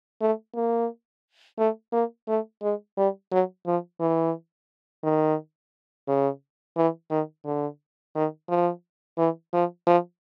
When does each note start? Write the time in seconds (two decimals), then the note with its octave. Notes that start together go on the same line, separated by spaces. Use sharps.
0.21 A3
0.55 A#3
1.58 A3
1.93 A#3
2.28 A3
2.63 G#3
2.97 G3
3.32 F#3
3.66 F3
4.00 E3
5.03 D#3
6.08 C#3
6.77 E3
7.11 D#3
7.45 D3
8.15 D#3
8.49 F3
9.18 E3
9.53 F3
9.87 F3